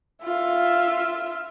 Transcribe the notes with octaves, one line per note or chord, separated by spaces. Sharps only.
F4 E5